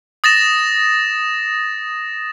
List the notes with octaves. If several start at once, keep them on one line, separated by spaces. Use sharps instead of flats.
D#6 A6 A#6 E7